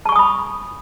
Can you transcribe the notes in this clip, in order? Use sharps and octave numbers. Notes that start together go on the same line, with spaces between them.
G#5 A5 B5 C#6 D#6